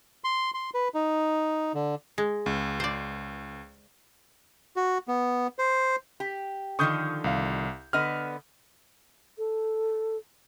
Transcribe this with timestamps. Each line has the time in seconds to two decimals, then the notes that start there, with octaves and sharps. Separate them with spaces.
0.24 C6
0.54 C6
0.74 B4
0.94 D#4
1.75 D3
2.18 G#3
2.46 C#2
2.80 C5 D5
4.76 F#4
5.08 B3
5.59 C5
6.20 G4
6.79 D3 D#3 F3 C#6 D#6 G6
7.24 C2 F5
7.93 D3 B3 D#5 F6
9.38 A4